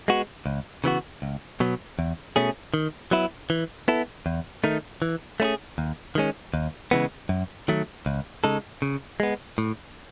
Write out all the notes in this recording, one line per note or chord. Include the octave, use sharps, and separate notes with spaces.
G#3 B3 F#4
C#2
C#3 E3 B3 F#4
C#2
B2 F#3 B3
E2
B2 A3 C#4 G#4
D#3
F#3 B3 E4
E3
B3 E4 A4
E2
D#3 A3 D#4
E3
A3 C#4 E4 G#4
D#2
D#3 G#3 C#4
D#2
C#3 E3 G#3 B3
F#2
D#3 F#3 A3
C#2
C#3 G#3 D#4 A4
C#3
G#3 B3
A2